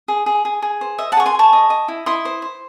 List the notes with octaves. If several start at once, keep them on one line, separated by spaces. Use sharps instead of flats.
G#4
G#4
G#4
G#4
C5
D#5 E5
F#5 A5
G#4 C#6
G#5 C6
G#4 A5 C#6
D#5
D#5
E4
E4 C6 D#6
C5
C5